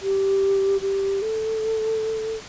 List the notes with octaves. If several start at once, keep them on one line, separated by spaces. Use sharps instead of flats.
G4
G4
A4